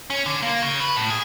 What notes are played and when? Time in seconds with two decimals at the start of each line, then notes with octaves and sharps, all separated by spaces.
0.10 C#4
0.26 D3
0.42 A#3
0.62 C#3
0.80 B4
0.96 A2
1.10 G#4